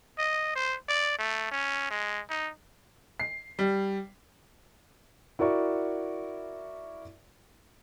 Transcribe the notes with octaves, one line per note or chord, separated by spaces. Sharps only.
D#5
C5
D5
A3
C#4
G#3
D#4
C7
G3
E4 F#4 A#4 D5 C#6